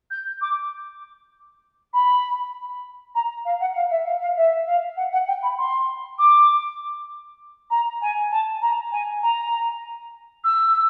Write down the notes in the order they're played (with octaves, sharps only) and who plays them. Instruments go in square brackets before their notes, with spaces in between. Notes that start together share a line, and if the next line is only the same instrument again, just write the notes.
[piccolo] G6
D6
B5
A#5
F5
F#5
F5
E5
F5
F5
E5
F5
F#5
F#5
G5
B5
C6
D6
A#5
G#5
A5
A#5
G#5
A#5
E6